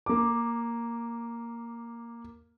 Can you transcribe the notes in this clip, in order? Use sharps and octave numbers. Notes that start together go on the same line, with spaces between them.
A#3 D6